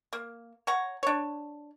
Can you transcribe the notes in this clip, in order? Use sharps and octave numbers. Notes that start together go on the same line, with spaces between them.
A#3
C#5 F#5 A#5
D4 C#5